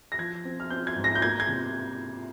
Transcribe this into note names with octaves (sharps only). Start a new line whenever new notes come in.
A#6
F3 G#6
C4
F6
C4 G6
G#6
G#2
A#6
G6
A#3 G#6
G#6
C3